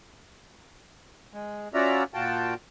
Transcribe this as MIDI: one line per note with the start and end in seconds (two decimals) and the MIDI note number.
1.33 1.68 56
1.74 2.03 61
1.74 2.03 65
1.74 2.03 66
1.74 2.03 74
1.74 2.03 76
1.74 2.03 82
2.14 2.54 46
2.14 2.54 65
2.14 2.54 66
2.14 2.54 79
2.14 2.54 81